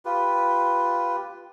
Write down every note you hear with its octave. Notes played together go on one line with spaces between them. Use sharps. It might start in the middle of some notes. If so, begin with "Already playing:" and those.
F4 G4 B4